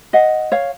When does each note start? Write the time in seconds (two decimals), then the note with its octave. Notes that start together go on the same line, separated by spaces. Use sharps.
0.13 D#5 F#5
0.52 C#5 F5